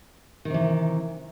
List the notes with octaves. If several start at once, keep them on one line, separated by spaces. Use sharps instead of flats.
C3 D#3 E3